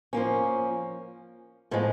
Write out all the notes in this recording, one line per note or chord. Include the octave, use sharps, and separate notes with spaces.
F3 A#3 C#4
A2 F3 G#3 B3